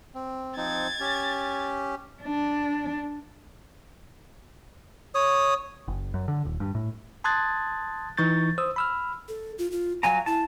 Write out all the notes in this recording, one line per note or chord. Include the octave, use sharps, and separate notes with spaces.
C4
F3 C4 D#4 G#6 A6
C#4 G4
D4
C#5 D#6
F#1
F#2
D3
D#1
G2
A2
A5 C6 D#6 F#6 G#6 A6
E3 D#4 C#6 G6 A6
C5 D#6 E6
B5 E6 F6
A4
F4
F4
F#3 F5 G#5 A#5
E4 A5